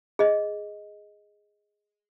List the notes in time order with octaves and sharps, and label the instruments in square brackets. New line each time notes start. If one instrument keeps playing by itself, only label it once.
[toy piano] G#4 D#5